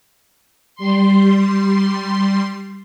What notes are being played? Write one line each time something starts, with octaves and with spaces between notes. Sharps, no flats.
G3 C6